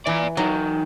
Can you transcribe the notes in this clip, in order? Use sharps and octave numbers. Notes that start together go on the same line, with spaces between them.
E3 D5 A#5
E3 F#3 D#4